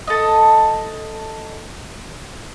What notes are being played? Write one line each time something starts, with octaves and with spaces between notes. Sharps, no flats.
A4 D#5